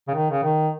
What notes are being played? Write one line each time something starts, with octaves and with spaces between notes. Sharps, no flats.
C#3
D#3
C#3
D#3